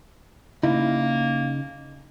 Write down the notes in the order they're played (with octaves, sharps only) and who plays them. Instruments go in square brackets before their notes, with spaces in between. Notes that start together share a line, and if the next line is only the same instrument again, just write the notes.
[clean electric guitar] C#3 D#4 [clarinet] A#3 [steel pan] E4